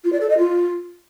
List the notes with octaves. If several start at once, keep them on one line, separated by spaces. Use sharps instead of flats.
F4
D5
A4
D#5
F4